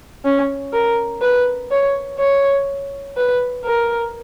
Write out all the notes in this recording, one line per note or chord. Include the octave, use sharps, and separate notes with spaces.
C#4
A#4
B4
C#5
C#5
B4
A#4